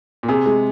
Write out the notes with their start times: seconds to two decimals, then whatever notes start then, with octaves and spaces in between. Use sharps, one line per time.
0.23 A#2
0.28 C3 G#4
0.46 G#3